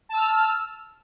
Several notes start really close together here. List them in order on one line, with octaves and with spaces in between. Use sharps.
A5 E6 F6